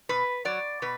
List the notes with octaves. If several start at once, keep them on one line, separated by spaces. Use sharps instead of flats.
B2 B4
F#3 D5
B2 B4